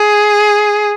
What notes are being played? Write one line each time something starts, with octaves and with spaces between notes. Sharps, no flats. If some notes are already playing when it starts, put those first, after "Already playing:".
Already playing: G#4